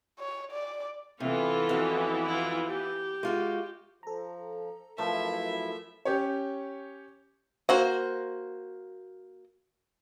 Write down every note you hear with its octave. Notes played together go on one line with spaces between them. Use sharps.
C#5
D5
C3 E3 B3 F4 A4 B4
F2 F#4
E4 F4
G4
G#3 F4 F#4
F3 A4 A#5
F#2 F3 A3 E4 A#4 B4 E5 F5
C#4 G4 C#5
A#3 F#4 C5